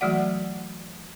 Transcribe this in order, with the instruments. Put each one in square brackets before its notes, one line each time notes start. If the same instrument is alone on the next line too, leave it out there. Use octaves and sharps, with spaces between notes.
[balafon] E3 F#3 A3 F#4 D5 F#5